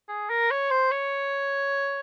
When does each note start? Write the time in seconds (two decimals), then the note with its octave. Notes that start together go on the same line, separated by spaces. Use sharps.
0.09 G#4
0.30 A#4
0.51 C#5
0.71 C5
0.91 C#5